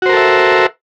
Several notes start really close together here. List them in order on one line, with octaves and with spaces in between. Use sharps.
F#4 C5 A#4 A4 E5